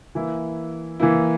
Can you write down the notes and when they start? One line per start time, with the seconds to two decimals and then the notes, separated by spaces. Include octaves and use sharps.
0.15 E3 A#3 E4
1.00 E3 A#3 E4